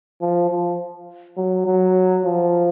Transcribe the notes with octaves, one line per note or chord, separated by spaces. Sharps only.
F3
F3
F#3
F#3
F3